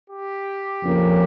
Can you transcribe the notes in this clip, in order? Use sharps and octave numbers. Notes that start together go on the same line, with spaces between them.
G4
F2 C#3 F3 A#3 C#4